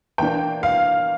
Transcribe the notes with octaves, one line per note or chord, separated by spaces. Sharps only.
E3 A#3 D4 G5
F5